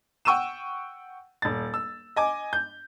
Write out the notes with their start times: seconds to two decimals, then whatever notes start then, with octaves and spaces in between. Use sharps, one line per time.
0.25 F#5 G5 C#6 E6 D#7 E7
1.42 D#1 A6
1.74 E6
2.16 D#5 G#5 D6
2.53 G6